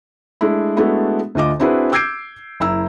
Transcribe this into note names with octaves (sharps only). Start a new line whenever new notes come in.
G#3 A3 D4 E4
G#3 A3 B3 D4 E4 F#4
D2 D3 F4 D#5 D6
C4 D4 E4 F#4 G#4 B4
D6 E6 G6 G#6 C7 D7
F#1 E4 A#5 E6